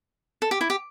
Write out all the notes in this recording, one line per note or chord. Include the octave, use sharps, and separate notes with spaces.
A4
G4
E4
G4